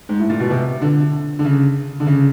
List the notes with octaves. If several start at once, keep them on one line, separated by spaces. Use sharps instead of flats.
G#2
A2
A#2
B2
C3
D3
D3
C#3
D3
C#3